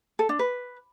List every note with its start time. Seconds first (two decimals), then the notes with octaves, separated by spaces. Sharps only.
0.19 A4
0.29 D4
0.39 B4